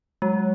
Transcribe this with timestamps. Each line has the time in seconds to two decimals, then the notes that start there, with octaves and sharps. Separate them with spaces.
0.22 F#3 G#3